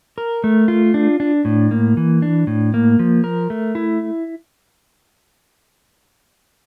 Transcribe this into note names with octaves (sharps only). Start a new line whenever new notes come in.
A#4
A3
F4
D4
D4
A2
A#3
E3
D4
A2
A#3
F3
A#4
A3
E4